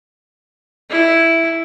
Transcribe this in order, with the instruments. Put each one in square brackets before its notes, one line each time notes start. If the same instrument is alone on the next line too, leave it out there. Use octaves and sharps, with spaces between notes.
[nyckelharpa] E4